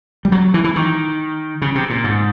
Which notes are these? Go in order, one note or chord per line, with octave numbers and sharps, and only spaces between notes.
G3
F#3
E3
E3
D#3
C#3
C3
A#2
G#2